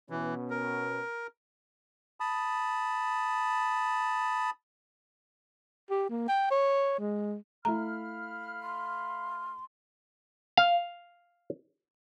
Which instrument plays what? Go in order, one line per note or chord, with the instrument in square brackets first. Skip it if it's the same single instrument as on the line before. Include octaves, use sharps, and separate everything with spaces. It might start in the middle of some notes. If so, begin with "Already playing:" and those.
[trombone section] B2 B3 C#4 [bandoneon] E3
[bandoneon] A#4
[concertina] A5 B5 D#6
[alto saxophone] G4
A#3
G5
C#5
G#3
[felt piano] A3 E4 [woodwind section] F5 B5 F6 [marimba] A#5
[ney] C6
[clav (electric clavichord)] F5